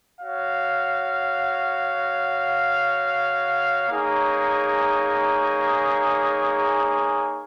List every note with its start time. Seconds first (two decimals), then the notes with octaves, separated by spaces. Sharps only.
0.20 F#4 C#5 F5
3.89 A#3 D#4 G#4 C#5